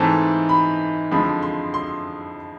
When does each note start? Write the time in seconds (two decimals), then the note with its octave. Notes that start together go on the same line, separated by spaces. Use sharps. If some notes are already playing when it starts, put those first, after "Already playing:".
Already playing: G#2 E3 A3 C4 A5
0.49 B5
1.11 F2 D3 F3 G#3 B5
1.43 C6
1.74 C6